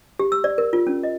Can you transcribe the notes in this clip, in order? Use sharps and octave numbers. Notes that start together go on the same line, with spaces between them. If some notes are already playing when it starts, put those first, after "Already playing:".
G4
E6
D5
A#4
F4
C#4
D#5